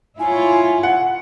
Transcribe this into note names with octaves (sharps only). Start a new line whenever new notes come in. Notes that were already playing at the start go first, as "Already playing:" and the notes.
E4 F4 C#5 G#5
F#5